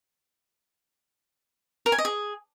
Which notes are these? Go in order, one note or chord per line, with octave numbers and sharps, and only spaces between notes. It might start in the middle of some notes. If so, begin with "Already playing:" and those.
A#4
G#5
D#5
G#4